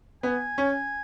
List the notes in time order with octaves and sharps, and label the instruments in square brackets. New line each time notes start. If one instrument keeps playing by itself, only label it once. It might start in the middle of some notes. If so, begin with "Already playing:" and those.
[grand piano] B3 [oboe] G#5
[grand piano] C#4